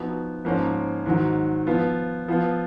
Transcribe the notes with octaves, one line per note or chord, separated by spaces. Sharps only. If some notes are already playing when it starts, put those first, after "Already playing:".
Already playing: F3 B3 D#4 F#4
G#2 F3 A#3 C#4
G#2 D#3 F#3
F3 B3 F4
F3 B3 F4